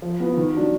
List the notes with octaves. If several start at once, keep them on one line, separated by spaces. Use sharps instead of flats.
F3
B3 F4
D#3
F#3 D4 F#4